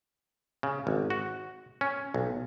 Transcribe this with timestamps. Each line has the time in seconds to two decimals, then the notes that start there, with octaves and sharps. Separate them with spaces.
0.63 C#3
0.87 G#1
1.10 F#4
1.81 C#4
2.14 B1